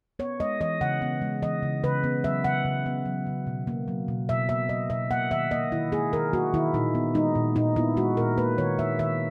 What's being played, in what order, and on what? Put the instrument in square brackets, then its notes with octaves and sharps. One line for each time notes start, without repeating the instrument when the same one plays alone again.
[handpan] B3 C#5
G#3 D#5
E3 D#5
C#3 F#5
B3
G#3
E3 D#5
C#3
C#3 B4
B3
F#3 E5
C#3 F#5
C#3
B3
F#3
C#3
B2
A#3
F#3
B2
B2 E5
A#3 E5
F#3 D#5
B2 E5
A#3 F#5
D#3 E5
A#3 D#5
D#3 E4
A#3 G#4
D#3 A#4
A#3 F#4
D#3 E4
A#2 D#4
B3
G#3 D#4
A#2
A#2 D#4
B3 E4
G#3 F#4
A#2 A#4
A#3 B4
D#3 C#5
A#3 E5
D#3 E5